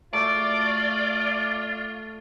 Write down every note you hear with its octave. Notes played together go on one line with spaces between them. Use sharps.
A3 F4 D5